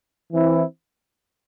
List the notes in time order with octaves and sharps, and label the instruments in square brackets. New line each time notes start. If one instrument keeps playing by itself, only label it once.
[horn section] E3 C4 E4